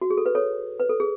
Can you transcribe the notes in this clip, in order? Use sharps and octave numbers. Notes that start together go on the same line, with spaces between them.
F#4
G#4
A4
B4
A4 C#5
B4
A4
G#4